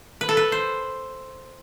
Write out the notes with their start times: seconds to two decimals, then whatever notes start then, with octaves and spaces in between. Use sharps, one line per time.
0.21 B4
0.29 A4
0.37 B4
0.52 C5